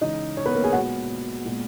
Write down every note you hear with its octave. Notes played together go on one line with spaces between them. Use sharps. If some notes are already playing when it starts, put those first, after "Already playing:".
C#3 E3 G#3 D#4 D#5
C#4 C#5
B3 B4
A#3 A#4
G#4 G#5
A#2 G#3 B3 F#4 F#5
A#2 G#3 B3